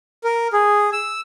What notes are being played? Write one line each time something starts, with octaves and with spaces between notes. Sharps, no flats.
A#4
G#4
E6